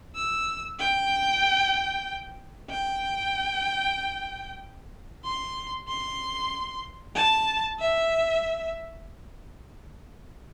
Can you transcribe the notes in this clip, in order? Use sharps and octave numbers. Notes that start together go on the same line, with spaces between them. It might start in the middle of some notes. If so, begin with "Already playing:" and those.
E6
G5
G5
C6
C6
A5
E5